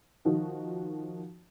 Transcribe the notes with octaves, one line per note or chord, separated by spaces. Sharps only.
D#3 F3 D#4 F#4